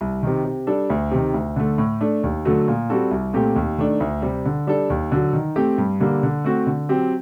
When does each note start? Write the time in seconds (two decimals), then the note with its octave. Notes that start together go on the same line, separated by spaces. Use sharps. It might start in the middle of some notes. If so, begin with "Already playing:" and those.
0.01 C2
0.23 C3 D#3
0.45 C3
0.67 G3 D4 A4
0.90 D2
1.11 C3 D#3
1.34 D2
1.56 D3 A3
1.78 A2
2.01 A3 D4
2.23 D#2
2.45 D3 F#3 A3
2.68 A#2
2.90 G3 C4 F#4 A4
3.11 C2
3.33 A#2 A3 C4 G4
3.56 D#2
3.78 D#3 A3 D4
4.00 D2
4.22 C3 G3
4.45 D3
4.67 G3 D4 A4
4.90 D#2
5.12 D3 F#3
5.33 D#3
5.56 A3 C4 G4
5.78 G2
6.00 D3 G3 A#3
6.23 D3
6.44 A3 C4 F#4
6.67 D3
6.89 F#3 C4 G4